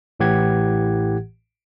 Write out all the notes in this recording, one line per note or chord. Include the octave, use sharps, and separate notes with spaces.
A1 A2 E3 G4 F#5 G#6